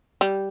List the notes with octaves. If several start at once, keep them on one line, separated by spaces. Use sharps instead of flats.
G3